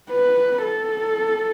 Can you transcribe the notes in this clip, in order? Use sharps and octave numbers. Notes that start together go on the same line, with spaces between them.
B4
A4